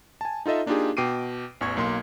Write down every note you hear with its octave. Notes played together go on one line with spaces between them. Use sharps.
G#5 A5
D#4 F4 A4 D#5 E5
A#3 D4 D#4 F4 G4 G#4
B2 G5 D6 C7 D7 D#7
A1 E2 C#6 G#6
B1 A#3 C6